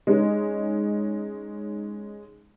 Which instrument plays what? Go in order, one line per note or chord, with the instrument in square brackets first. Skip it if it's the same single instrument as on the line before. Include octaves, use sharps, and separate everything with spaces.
[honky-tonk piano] G#3 C#4 D#4